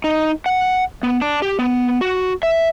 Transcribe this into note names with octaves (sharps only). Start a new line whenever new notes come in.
D#4
F#5
B3
D4
G4
B3
F#4
E5